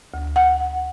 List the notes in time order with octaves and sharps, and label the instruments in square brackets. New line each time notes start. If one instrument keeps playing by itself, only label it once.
[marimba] D2
F#5